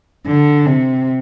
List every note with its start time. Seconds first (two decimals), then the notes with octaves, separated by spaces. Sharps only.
0.27 D3
0.66 C3